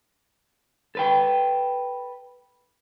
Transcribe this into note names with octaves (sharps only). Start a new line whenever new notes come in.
A4 B4 G5